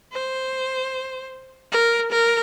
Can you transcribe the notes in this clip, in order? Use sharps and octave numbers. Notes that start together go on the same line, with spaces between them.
C5
A#4
A#4